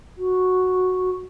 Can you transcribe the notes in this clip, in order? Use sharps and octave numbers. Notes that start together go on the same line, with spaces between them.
F#4